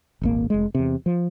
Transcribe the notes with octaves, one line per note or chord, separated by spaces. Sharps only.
D#1 G#1 A#3
F1 G#3
E2 C3
F3